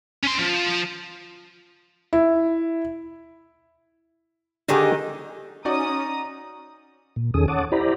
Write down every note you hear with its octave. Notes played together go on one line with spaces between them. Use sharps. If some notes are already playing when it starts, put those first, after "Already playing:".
C#4 C6
F3
E4
D3 D#3 D4 D#4 G4 G#4
C#4 D#4 F#4 D5 A#5 D#6
A#2
E2 D#3 C#4 G#4 A4 D#6
C#5 F#5 A5 D6 D#6
E4 G4 C5 D5 A#5 B5